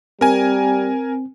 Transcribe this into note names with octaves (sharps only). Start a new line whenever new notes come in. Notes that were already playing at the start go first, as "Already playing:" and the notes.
G3 C4 A#4 G#5